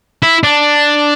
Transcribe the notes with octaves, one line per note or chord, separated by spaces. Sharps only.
E4
D4